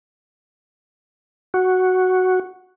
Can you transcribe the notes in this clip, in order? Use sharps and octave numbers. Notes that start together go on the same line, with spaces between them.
F#4